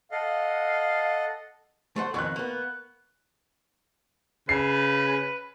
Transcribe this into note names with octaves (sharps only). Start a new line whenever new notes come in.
A4 D#5 F5 F#5
A3 C5 F#5
F2 B2 D#3 C#6 F#6
A#3 B3
C#3 B4 C7